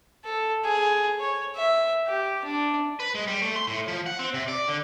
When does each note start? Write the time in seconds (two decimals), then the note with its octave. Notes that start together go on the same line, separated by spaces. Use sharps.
0.24 A4
0.64 G#4
1.20 C#5
1.55 E5
2.07 G4
2.44 D4
3.00 B4
3.15 G#3
3.27 G3
3.42 A3
3.56 C6
3.68 A2
3.88 F3
4.06 F#5
4.19 C4
4.34 C3
4.48 D5
4.68 D3